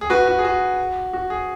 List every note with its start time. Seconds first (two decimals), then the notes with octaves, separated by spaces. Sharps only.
0.01 G#4
0.10 F#4 B4
0.27 F#4
0.39 G#4
0.45 F#4
1.13 F#4
1.30 G#4